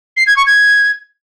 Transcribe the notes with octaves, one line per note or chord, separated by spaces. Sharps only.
C7
G#6
C#6
G#6